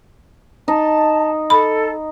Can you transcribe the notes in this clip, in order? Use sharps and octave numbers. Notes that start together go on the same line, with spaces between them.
D#4 A5
A4 B5